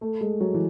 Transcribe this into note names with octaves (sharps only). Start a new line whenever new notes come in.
A3
G#3
F#3
E3